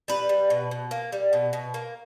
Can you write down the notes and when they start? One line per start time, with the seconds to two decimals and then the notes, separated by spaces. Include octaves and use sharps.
0.08 G3 B4
0.29 G3
0.50 B2
0.71 B2
0.91 A#3
1.12 G3
1.33 B2
1.53 B2
1.74 A#3